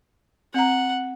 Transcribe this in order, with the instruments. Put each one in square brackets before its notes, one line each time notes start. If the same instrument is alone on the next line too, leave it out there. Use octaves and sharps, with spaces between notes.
[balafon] C4 A#5 [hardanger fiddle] F#5